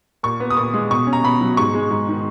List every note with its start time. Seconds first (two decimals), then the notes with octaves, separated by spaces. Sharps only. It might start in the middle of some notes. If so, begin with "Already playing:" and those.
0.23 A#2 C#6
0.40 B3
0.50 D#6
0.57 A#2 C#6
0.74 G#3
0.90 B2 C#6
1.07 C#4
1.13 A#5
1.23 B2 B5
1.41 F#3
1.57 G#2 C#6
1.74 G#3
1.91 G#2
2.08 D#3